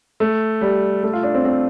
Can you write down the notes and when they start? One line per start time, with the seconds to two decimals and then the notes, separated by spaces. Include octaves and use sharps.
0.20 A3
0.61 G3
1.03 A3
1.13 F4
1.23 D4
1.35 C4
1.45 C4